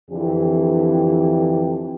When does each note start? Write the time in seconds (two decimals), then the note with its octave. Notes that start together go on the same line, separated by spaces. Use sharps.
0.10 F2 D3 E3 G4